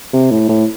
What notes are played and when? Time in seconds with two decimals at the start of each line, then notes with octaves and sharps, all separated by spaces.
0.13 C3
0.31 A2
0.49 A2